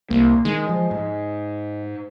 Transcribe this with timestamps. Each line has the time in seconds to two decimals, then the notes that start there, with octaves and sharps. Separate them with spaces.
0.10 C2 A#3
0.45 D#3 G#3
0.69 F3
0.91 G#2